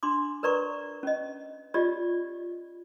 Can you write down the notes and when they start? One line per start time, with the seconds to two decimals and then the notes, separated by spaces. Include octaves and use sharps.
0.03 D4 C6 D6
0.43 A#4 B4 D5 A#5 C#6
1.03 C#4 D#5
1.74 F4 G4 D5 D#5